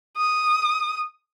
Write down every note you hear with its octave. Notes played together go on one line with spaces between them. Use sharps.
D#6